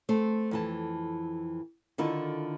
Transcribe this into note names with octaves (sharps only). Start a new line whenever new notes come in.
A3 C4 C5
F2 E3 A5
D3 D#3 E4 F4 A4